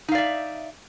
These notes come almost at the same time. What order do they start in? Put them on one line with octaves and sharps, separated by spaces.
D#4 F5 D5 E5